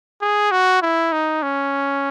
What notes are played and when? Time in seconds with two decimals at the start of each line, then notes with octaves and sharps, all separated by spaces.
0.22 G#4
0.51 F#4
0.82 E4
1.12 D#4
1.43 C#4